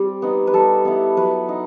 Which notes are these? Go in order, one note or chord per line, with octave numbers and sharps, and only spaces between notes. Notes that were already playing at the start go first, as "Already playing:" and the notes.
Already playing: G3 C4 G4
B3 D#4
B4
G3 A4
B3 E4
F#3 B4
D#4